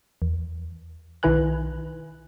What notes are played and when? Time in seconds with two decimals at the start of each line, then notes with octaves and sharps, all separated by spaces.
0.22 E2
1.23 B1 D#3 E4 B4 G#5 F#6